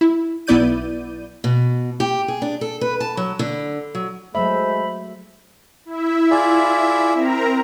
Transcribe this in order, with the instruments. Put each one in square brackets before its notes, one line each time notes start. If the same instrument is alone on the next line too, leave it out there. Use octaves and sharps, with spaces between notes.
[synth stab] E4
B1 B3 E4 D5 G6 D#7
[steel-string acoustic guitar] B2
G4
G#4
D4
A4
B4
A5
F#3
D3
F#3
[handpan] F#3 A3 E5 [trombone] G#3 [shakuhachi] C5 [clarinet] B5
[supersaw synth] E4 E5
[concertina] F4 G#4 D5
[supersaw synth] C4 A#4 A#5